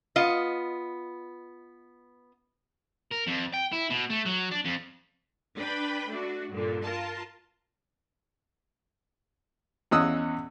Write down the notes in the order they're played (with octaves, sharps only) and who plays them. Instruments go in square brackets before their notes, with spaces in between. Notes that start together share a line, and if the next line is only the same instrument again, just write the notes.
[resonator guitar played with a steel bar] B3 F4 D#5
[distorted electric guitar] A#4
F2
G5
E4
B2
A3
F#3
D4
F2
[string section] D4 B4 G5 B5
A3 D4 F#4
G2 A#2 D3
F4 A#4 A5
[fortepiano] E2 C#4 D#5 D#6 E6 F#6